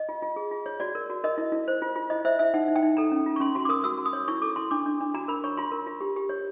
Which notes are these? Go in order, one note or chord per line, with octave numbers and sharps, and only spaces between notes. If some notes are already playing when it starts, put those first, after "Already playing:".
Already playing: D#5
F4
F4
G#4
F4
C#5
F#4 D5
A#4
F#4
A#4 D#5
E4
E4
C5
F4
F4
E4 D#5
C5 E5
E4 E5
D#4 F#5
D#4
G5
D#4
A4 A#5
C#4
F4
C#6
C#4 C6
F#4 C6
D6
A#4 D#6
F#4 E6
F#4
D#6
C#5
E4 C#6
A4 D6
E4 C6
D4 D6
D4
D4
F#4 A#5
A#4 B5
C#5 C#6
F4 C6
A#4
F4
G4
G4
C#5